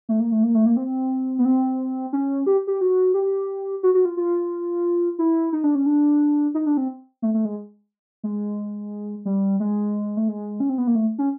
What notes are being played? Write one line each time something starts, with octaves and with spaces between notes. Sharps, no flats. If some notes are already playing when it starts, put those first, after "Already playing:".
A3
A#3
A3
A#3
A3
A#3
C4
B3
C4
C#4
G4
G4
F#4
G4
F#4
F#4
F4
F4
E4
D#4
D4
C#4
D4
D#4
D4
C4
A3
A3
G#3
G#3
G3
G#3
A3
G#3
C#4
C4
B3
A#3
A3
C#4